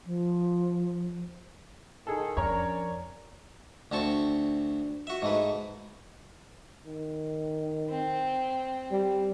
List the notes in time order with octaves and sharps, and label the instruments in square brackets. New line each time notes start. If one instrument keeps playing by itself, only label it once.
[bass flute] F3
[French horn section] D#3 [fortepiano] G#4 A4
[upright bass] F2 [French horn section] C#4 D4 D5 [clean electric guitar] A#4 A#5 [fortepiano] C#5
[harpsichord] D2 C4 A5 C#6
F#4 E5
G#2 A3 B4
[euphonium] D#3
[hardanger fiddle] C4
[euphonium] G3